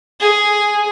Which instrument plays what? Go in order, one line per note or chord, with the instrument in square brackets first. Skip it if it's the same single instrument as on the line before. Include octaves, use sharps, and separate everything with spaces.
[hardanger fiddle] G#4